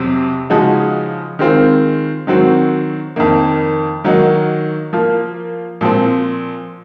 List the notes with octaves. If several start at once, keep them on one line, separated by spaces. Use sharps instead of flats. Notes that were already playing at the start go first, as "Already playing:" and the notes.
Already playing: F2 C3 F#3 C4
C#3 F3 G#3 D#4 F#4
D#3 G#3 C4 F4
D#3 F#3 C4 F#4
F2 D#3 A#3
D#3 F#3 A#3 D#4 F#4
F3 A#3 F4
A#2 F3 C4